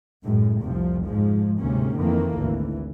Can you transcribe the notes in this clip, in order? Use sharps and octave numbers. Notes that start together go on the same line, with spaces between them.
F#2 A2 G#3
F1 C2 C3 F3
G#2 F3 G#3
D2 G#2 C3 A#3 C#4
F2 D#3 E3 A3 A#3
G#1 D2 E3